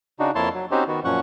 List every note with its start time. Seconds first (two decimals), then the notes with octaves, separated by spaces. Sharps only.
0.19 C#3 D4 D#4 F#4
0.35 F2 A#3 E4 C#5 A5 C6
0.54 F#3
0.71 C4 C#4 D#4 F#4 G4 C5
0.88 D#3 B3 F#4
1.05 F#2 A#2 F3 C#4 F#5 C#6